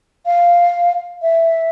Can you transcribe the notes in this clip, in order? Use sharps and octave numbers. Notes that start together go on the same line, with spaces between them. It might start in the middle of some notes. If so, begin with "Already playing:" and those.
F5
E5